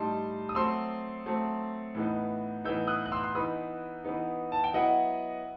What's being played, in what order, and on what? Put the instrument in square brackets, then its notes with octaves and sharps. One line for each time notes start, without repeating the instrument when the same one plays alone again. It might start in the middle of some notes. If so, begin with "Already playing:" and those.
Already playing: [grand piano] A2 G3 D#4 A5 C6
D#6
F#3 A3 C4 C6 E6
F#3 A3 C4
A2 E3 B3 D#4
A2 E3 B3 D#4 E6 G6
D#6 F#6
F#6
C6 E6
C6
E3 B3 D#4 B5 D#6
E3 B3 D#4
A5
G5
F#3 B3 E4 D#5 F#5